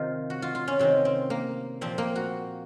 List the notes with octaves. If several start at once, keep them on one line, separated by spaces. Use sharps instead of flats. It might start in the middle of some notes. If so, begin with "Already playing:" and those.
Already playing: C3 D#3 C4 D#4 F4
F#4
F4
F4
C#4
C3 D#3 C4
C4
A#3
A#2 F3 C4
A#3
F#4